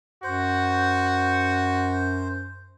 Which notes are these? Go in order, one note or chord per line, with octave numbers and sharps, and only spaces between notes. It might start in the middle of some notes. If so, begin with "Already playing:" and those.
F#2 F#4 C5